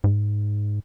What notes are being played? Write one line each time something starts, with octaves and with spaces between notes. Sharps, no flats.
G#2